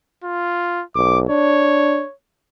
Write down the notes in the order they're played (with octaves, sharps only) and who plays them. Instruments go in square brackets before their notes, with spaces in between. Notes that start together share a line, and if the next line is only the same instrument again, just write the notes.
[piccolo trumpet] F4
[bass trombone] B1 [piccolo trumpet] D6
[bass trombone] D4 [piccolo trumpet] C#5